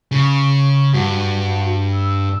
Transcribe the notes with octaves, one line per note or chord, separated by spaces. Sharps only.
C#3 C#6
G2 F#4
E6